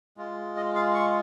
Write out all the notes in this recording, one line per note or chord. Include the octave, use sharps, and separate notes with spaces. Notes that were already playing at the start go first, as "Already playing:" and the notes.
G#3 F4
D#5
F5
C#6